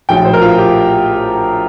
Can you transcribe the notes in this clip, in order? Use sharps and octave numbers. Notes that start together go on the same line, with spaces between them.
A#1 A2 F#3 G5
C5
A#4
F4
G4